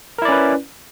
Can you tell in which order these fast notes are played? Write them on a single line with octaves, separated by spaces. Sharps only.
A#4 E4 D5 C#4 B4